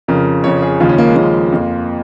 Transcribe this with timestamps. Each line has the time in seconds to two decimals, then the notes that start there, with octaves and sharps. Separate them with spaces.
0.08 F2 C#3 F3 A#4
0.44 F2 C#3 F3 C#5
0.62 G#4
0.80 D#2 C#3 F3 F4
0.89 C#4
0.98 A#3
1.07 G#3
1.16 D#2 C#3 F3 A#3
1.52 F2 F3